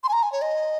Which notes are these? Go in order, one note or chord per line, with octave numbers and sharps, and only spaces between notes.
C6
G#5
A#5
G#5
C#5
D#5